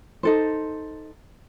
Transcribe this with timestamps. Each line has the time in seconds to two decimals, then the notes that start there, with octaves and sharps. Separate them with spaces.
0.23 D#4 A4 C5